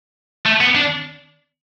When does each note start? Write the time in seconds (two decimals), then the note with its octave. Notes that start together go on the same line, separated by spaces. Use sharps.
0.45 A3
0.60 B3
0.75 D4